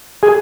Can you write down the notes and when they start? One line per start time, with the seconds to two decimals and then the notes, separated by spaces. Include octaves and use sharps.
0.23 G#4